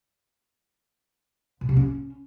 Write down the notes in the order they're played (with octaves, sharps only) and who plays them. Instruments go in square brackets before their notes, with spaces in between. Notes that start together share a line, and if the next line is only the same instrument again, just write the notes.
[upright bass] A#2
C3
C#4